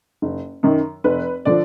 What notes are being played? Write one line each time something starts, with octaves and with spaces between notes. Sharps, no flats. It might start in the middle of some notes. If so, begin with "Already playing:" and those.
F#1
F#2 D#3
F1 B4
D3 F3 D5